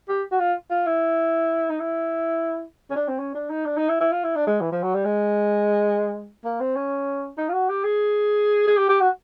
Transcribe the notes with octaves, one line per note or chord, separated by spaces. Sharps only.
G4
F#4
F4
F4
E4
D#4
E4
C#4
D4
C4
C#4
D4
D#4
D4
D#4
E4
E4
F4
E4
D4
G#3
E3
F3
F#3
G3
G#3
A#3
C4
C#4
D#4
F4
F#4
G4
G#4
G#4
G4
G4
F#4